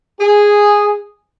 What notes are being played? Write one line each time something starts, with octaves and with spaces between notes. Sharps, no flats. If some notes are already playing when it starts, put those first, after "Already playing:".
G#4